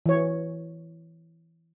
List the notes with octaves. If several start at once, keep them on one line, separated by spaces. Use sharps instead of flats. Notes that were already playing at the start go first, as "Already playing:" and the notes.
E3 C#5